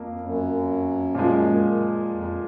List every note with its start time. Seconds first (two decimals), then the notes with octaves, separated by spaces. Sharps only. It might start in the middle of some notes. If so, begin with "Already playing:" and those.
Already playing: F2 F3 A#3
0.21 F#2
1.15 A#2 F3 G#3
2.09 F2